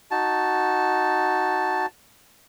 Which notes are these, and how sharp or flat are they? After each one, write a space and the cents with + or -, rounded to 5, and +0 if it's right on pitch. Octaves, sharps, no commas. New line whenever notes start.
D#4 +0 F#4 +0 A5 +0